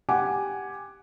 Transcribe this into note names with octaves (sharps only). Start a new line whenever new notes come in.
G4 F#5 G#5 D6